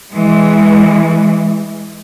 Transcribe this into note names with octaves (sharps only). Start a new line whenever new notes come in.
E3 G#3